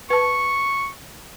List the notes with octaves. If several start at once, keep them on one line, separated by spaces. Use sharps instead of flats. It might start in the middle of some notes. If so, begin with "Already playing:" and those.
B4 A5 C#6